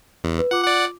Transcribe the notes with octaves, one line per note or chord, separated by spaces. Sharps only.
E2
B4
F4 F#5 D6
D5 F#5